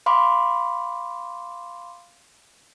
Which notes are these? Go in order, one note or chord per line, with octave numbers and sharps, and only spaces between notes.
F5 B5 C6 D6